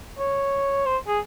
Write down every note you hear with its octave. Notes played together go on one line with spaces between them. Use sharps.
C#5
C5
G#4